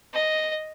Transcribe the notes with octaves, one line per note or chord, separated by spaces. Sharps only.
D#5